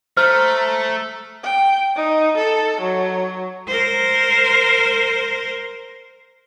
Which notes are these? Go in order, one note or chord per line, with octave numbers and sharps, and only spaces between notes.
A3 C5 A#5 F6
G5
D#4
A4
F#3
A#4 C5